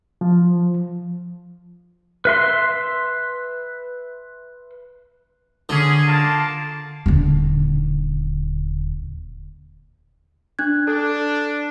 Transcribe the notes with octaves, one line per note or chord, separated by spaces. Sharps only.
F3
B4 E5 C6
D3 C#4 G#4
A#3 F4 A5
D#1 D3
D4 F#6 G#6
D4 A4